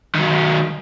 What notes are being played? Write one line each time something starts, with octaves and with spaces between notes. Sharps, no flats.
D#3 F#3